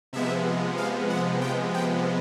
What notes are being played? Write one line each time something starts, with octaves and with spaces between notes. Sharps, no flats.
C3 F3 G#3 B3 E5
F5
F#5
G5
G5